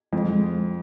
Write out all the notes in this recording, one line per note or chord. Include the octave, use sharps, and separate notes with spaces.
F2 G#3
G#3